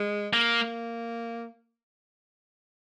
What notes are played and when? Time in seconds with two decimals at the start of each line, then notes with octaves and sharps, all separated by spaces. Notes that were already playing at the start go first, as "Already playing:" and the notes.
Already playing: G#3
0.33 A#3
0.63 A#3